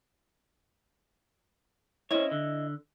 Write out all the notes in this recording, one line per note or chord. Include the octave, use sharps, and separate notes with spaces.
C#4 E4 C5 C#5 D#5
D3